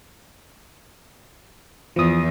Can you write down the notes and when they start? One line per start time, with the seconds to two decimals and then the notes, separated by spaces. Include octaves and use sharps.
1.96 E2 F3 D#6